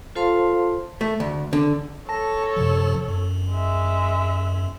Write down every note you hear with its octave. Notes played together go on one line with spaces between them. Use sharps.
F4 A4 C5 F5 A5 C6
A3
D2
D3
A4 C#5 A5 A#6
F#2 C3 F3
F#2
G#3 E5